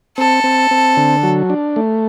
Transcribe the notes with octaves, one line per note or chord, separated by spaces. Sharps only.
C4 A4
C4
C4
D3
F#3
D4
A3